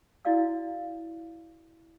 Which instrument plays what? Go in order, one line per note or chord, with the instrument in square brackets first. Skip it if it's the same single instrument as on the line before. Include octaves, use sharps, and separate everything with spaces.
[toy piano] E4 F#4 D5 F5 E6